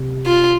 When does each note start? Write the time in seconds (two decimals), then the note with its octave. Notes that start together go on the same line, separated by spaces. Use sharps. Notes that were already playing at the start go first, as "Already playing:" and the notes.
Already playing: C3
0.26 F4